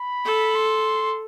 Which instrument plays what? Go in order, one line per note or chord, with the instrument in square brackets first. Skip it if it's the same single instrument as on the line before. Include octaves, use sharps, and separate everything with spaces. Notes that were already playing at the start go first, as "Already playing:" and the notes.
Already playing: [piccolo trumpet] B5
[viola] A4
[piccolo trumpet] C6